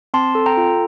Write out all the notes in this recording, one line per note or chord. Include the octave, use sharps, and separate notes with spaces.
C4 A5 C6
A4
G5 A#5
F4